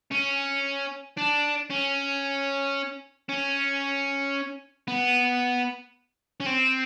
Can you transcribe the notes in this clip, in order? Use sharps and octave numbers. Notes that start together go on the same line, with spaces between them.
C#4
D4
C#4
C#4
B3
C#4
C4